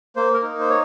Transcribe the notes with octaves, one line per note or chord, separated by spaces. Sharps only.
A#3 C5
A#4
D#4
C5
C#5